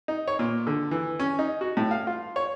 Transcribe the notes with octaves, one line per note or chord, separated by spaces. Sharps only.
D#4
C#5
A#2
D3
E3
C#4
D#4
F#4
A2
F5
F4
C#5